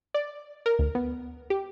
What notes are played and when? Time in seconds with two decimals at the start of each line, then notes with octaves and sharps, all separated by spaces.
0.14 D5
0.66 A#4
0.79 D2
0.95 B3
1.50 G4